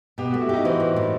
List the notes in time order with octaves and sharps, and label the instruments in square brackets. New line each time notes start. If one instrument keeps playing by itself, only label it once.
[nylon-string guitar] B2 [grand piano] G4
[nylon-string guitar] A3 [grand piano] F#4
[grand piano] E4
[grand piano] D#4 [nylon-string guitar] G4
[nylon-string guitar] E3 [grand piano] C4
[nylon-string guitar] A2
A2